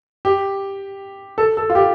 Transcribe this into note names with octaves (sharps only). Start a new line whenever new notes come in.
G4
A4
A4
F4
G4